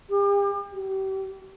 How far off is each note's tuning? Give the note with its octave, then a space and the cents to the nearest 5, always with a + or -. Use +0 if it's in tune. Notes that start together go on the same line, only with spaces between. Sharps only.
G4 +40
G4 -35